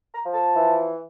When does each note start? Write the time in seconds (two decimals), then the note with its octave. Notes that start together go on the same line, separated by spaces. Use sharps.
0.14 A#5
0.24 F3
0.34 A5
0.55 E3